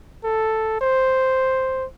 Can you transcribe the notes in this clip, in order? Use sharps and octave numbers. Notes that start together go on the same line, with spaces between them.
A4
C5